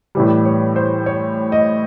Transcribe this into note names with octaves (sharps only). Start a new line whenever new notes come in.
A2 E3 G3
C#5
C5
C#5
D#5